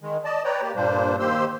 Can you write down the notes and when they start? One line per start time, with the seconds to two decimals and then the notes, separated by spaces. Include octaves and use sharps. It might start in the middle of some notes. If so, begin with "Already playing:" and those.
0.01 D#3 G#3
0.25 D5 D#5 A5
0.44 B4 C#5 D5 G5 A#5
0.62 A#3 G4
0.76 G2 A#2 G3 A#3 D4 C5
1.20 D#3 A#3 G4 C5 C6 E6